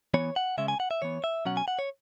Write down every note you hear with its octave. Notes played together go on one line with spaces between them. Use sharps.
E3 B3 C#5
F#5
C#3 G#3 C#4 E5
G#5
F#5
E5
E3 B3 C#5
E5
B2 F#3 C#4 F#5
G#5
F#5
C#5